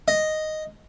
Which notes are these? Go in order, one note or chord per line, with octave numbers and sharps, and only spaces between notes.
D#5